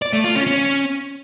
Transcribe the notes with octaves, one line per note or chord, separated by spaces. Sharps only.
D5
A3
F4
C#4
C#4